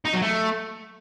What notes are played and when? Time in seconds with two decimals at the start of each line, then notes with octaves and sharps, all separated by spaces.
0.05 D#4
0.13 F#3
0.22 A3